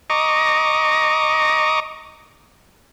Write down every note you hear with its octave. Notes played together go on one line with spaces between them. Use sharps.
D#5 A#5 C#6 D6